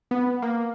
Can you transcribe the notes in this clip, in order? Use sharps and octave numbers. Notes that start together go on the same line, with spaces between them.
B3
A#3